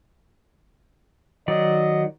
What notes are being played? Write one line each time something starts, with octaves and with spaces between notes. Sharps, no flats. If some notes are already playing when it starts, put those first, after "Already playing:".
D#3 F#3 D5 D#5